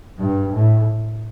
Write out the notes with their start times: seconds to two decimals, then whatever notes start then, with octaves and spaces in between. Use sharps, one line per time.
0.18 G2
0.53 A2